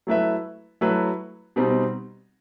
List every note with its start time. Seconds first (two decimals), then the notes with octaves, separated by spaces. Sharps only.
0.07 F#3 A3 E4 B4 E5
0.81 F#3 A3 E4 B4 E5
1.56 B2 G3 C4 D#4